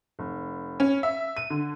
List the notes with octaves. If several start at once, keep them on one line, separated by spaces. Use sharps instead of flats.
F1
C#4
E5
D#7
D3